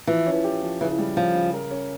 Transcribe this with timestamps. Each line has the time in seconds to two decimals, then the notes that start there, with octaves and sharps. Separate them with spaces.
0.07 E3 F3
0.26 C#4
0.44 G4
0.62 F3
0.81 C#3 E3
0.98 G3
1.17 F3 C#4
1.35 C#3
1.53 A#4
1.71 C#4